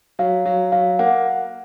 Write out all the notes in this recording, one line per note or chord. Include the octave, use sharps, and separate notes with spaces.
F#3 F5
F#3
F#3 F5
A#3 F#5